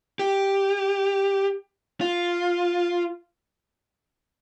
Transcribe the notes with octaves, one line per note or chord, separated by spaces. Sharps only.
G4
F4